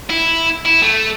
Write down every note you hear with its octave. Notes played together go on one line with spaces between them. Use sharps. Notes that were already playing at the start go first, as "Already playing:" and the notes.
E4
E4
A3